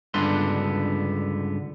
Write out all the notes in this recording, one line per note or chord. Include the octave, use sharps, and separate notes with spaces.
C#2 G2 D3 B3 D4 C6